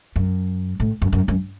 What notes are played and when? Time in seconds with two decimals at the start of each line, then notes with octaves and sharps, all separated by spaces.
0.16 F#2
0.80 A2
1.02 F#2
1.13 F#2
1.28 F#2